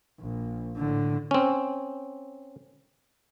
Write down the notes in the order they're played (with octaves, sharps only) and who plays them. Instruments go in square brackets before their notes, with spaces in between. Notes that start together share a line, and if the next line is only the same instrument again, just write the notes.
[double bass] A#1
A2 D3
[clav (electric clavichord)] C4 C#4